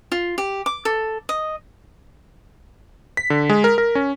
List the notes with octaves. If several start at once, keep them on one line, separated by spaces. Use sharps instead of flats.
F4
G4
D6
A4
D#5
B6
D3
G#3
A#4
A#4
C#4